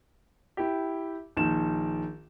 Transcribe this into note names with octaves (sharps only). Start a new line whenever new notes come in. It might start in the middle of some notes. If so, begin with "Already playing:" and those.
E4 G4
A#1 D#3 E7